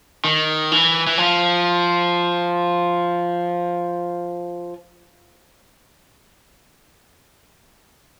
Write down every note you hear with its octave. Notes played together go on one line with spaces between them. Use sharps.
D#3
E3
E3
F3